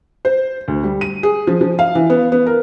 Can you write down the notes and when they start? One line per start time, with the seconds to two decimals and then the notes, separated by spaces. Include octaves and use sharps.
0.25 C5
0.68 D2
0.83 G3
1.01 D#7
1.23 G#4
1.47 F3
1.61 F3
1.79 F5
1.95 E3
2.10 B3
2.32 B3
2.46 A#4